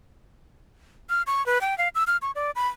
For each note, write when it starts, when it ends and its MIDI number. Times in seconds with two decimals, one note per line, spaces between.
1.09 1.22 89
1.27 1.45 85
1.46 1.61 71
1.61 1.77 79
1.78 1.88 77
1.95 2.04 88
2.07 2.17 89
2.22 2.31 85
2.35 2.51 74
2.56 2.68 83